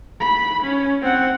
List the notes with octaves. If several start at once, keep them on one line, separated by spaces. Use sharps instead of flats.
B5
C#4
C4 F#5